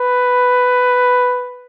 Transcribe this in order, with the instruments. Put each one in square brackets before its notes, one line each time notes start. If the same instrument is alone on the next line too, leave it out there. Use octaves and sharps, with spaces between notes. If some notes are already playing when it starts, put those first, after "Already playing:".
Already playing: [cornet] B4